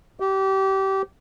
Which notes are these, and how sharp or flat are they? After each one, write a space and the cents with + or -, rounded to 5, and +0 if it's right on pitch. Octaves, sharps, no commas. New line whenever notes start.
G4 -25